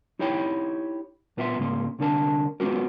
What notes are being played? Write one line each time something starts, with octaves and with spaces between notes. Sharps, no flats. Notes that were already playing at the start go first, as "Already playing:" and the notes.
D#4 E4 G4 C#5 G5 B5
A#2 B3 F4 E5 F#5 C6
G#2 C#3 A#3 C6
C2 D3 D4 A#4 A5
G#3 B3 C#4 F4 F#4 A#4